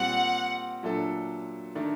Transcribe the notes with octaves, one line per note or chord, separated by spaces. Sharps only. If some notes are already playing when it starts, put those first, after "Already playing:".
Already playing: A#2 G3 C4 F#5
A#2 F#3 A3 D4 A4
D#3 A3 D4